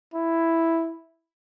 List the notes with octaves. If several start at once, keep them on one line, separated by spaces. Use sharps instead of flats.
E4